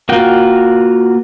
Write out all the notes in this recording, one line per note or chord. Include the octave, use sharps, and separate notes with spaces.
A#3 F4 F#4 G5